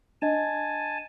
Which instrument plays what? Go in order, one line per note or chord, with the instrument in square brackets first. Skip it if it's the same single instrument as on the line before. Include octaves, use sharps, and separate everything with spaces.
[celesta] D4 D#5 [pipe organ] G#5 A5